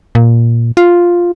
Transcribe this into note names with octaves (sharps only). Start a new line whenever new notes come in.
A#2
F4